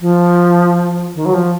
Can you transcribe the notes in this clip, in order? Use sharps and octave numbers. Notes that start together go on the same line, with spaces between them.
F3
D#3
F#3
F3